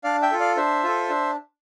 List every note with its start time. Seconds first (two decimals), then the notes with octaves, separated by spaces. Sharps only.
0.04 D4 D5 F5
0.22 E5 G5
0.31 F4 A4
0.40 D5 F5
0.57 D4 C5 E5
0.84 F4 A4
1.09 D4